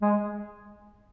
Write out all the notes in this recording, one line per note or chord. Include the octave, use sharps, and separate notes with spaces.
G#3